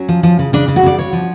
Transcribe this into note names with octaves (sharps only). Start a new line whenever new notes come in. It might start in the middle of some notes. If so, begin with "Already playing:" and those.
Already playing: F#3 C#4
F3
F3
C#3
C#3 D4
C#3
F#4
C#3 D5
C#3 C#5
F3